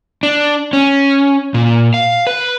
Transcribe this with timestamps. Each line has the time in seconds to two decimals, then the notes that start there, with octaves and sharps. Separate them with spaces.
0.23 D4
0.73 C#4
1.54 A#2
1.94 F5
2.27 B4